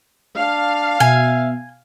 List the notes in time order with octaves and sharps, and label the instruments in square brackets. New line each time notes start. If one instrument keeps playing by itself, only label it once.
[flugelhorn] D4 [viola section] F5
[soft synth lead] B2 [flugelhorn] E5 [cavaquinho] G#5